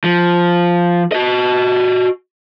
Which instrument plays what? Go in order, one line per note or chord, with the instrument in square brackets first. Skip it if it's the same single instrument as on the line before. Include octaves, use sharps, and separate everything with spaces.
[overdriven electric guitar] F3
F#4 D#5